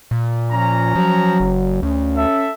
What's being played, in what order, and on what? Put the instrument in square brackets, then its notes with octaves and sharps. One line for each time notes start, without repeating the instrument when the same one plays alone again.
[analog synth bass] A#2
[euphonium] F3 [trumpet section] C#4 A#5
[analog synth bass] F3 [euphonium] F#3
[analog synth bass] F#1
[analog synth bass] D2 [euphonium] C#4
[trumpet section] A4 E5